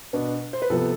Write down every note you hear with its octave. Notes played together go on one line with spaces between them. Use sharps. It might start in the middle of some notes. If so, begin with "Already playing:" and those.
B2 B3 D4
C5
B4
C3 F3 B3 A4